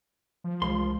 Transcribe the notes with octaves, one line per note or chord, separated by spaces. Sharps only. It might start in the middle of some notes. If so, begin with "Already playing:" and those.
F3
C2 E3 G#3 C6